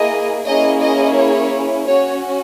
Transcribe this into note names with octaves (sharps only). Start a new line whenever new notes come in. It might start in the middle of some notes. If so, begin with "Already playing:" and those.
Already playing: A#3 E4 G#4 D#5
A#3 C#4 E4 G#4 D#5
D#5
C#5
C#4 F#4 C#5